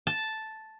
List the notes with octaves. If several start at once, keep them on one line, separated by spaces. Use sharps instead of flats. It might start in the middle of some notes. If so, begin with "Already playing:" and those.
A5